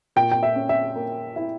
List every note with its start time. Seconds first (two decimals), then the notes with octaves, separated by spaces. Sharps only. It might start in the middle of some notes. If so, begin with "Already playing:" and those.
0.16 A#2 G5
0.31 G5
0.43 E5
0.56 C#4
0.69 E5
0.96 A#3
1.36 E4